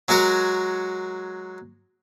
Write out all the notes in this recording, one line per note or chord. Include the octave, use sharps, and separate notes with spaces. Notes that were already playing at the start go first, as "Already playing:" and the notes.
F#3 G#3 F#4 A#4 C#5